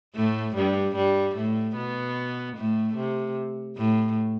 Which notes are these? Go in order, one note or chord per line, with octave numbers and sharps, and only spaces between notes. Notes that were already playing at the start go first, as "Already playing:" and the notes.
A2 A3
G2 G3
G2 G3
A2 A3
B2 B3
A2 A3
C3
A2